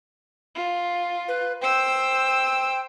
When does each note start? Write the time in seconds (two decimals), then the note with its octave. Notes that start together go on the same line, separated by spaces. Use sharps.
0.55 F4
1.28 B4
1.61 C5 G5 E6